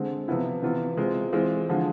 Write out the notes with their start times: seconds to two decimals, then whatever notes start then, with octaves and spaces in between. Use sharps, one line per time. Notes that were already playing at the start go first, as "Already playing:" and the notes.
Already playing: D3 G#3 C4
0.28 C3 F3 B3 E4
0.62 C3 E3 B3 F4
0.97 C3 G#3 C4 F4
1.33 E3 G#3 C4 F4
1.69 D3 F3 G#3